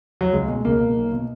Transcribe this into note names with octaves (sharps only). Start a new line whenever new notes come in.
F#3
C#2 G#3
B2 G#3
C#2 A#3
B2
B1
B2